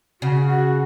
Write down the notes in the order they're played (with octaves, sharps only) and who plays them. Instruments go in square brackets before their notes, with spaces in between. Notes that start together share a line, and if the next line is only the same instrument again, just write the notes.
[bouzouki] C#3 [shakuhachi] F#4
[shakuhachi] F#4